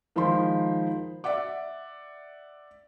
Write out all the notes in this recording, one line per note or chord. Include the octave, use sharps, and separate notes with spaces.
D#3 F3 G#3 D#4 B5 C6
D5 E5 F#5 D6